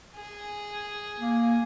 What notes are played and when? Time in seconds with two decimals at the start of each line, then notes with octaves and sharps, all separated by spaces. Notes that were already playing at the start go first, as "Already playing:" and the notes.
0.16 G#4
1.21 A#3